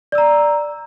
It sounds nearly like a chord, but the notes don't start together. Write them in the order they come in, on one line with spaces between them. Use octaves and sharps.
D5 E6 A#5